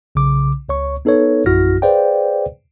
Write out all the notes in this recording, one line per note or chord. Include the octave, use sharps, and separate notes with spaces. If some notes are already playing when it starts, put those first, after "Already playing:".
B1 C#3 D6
C#2 C#5 C#6
B3 D#4 A4 B4 C#5
A#1 F#2 E4 F#4 F6 A#6
G#4 B4 C5 D5 F5 G5